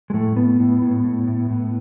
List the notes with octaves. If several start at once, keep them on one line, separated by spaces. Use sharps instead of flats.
G#3
A2 A3
A2 B3
A2
A2
A2
A2
A2